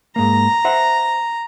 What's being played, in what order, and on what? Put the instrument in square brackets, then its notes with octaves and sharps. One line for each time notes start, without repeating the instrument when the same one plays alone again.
[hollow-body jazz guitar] G#2 A#3 [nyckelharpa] A#5
[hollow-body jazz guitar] C5 E5 F#5